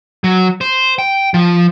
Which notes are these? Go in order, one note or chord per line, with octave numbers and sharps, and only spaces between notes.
F#3
C5
G5
F3